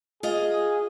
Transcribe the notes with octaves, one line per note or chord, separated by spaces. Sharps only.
F4 G#4 D#5